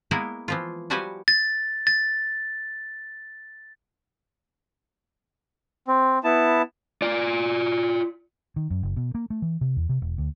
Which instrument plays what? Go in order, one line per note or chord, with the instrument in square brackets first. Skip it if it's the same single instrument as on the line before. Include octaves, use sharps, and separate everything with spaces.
[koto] G#3 A#3 B3 E4 A#4 B4
E3 F3 F4
F3 G3 F#4 G4 B4 G#5
[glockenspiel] A6
A6
[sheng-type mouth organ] C4
B3 E4 A5
[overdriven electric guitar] F4 D5
[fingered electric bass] D#3
F#2
F#1
B2
A#3
A3
E3
C3
E2
C3
E1
D2